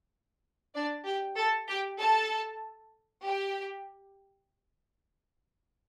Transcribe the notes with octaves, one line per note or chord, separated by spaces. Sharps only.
D4 D5
G4 G5
A4 A5
G4 G5
A4 A5
G4 G5